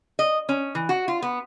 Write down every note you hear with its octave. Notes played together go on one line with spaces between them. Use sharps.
D#5
C#4
E3
F#4
F4
B3